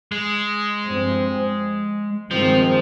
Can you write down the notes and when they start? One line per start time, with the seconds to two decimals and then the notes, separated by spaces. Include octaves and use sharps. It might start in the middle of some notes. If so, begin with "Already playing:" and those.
0.12 G#3
0.85 G2 F3 C4
2.31 G2 D#3 F3 G#3 C4